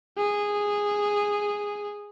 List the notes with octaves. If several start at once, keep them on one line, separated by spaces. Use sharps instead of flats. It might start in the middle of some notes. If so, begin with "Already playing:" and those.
G#4